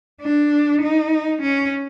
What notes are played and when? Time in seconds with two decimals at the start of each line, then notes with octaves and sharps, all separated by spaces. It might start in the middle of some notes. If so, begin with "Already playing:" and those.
0.21 D4
0.81 D#4
1.42 C#4